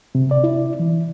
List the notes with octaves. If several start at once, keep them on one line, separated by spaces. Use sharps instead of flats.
C3
D5
E4
E3